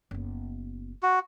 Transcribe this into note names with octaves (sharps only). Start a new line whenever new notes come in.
F#1 B3
F#4